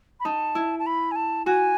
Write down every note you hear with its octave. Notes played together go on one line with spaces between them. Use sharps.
B5
D#4 A5
E4
A5
B5
G#5
A5
F#4 G#5